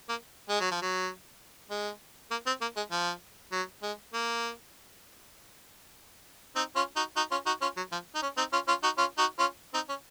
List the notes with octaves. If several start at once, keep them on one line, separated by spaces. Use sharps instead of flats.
A#3
G#3
F#3
F3
F#3
G#3
A#3
C4
A#3
G#3
F3
F#3
G#3
A#3
C4 D#4
C#4 F4
D#4 F#4
D#4 F#4
C#4 F4
D#4 F#4
C#4 F4
F#3
F3
D#4
C#4
C4 D#4
C#4 F4
C#4 F4
D#4 F#4
C#4 F4
D#4 F#4
C#4 F4
C4 D#4
C#4